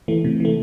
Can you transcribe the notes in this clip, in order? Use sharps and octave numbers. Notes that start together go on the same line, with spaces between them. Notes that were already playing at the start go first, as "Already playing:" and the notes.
E3 A3
C3
E3 A3